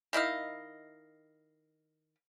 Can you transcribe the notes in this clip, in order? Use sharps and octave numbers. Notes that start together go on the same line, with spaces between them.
D#3 E4 D#5 F5